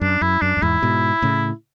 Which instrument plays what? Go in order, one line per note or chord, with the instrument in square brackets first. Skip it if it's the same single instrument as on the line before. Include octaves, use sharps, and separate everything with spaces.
[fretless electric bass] F#2 [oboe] D4
[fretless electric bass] F#2 [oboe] E4
[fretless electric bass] F#2 [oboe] D4
[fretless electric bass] F#2
[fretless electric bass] E2 G#2 [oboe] E4
[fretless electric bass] G#2 B2
A2 C#3